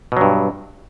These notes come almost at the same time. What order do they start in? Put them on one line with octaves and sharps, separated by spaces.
B2 F#3 G2